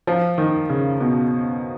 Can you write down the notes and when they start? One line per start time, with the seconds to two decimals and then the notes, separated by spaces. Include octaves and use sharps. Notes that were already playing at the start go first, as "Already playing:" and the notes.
0.07 F3
0.38 D#3
0.70 C#3
1.00 B2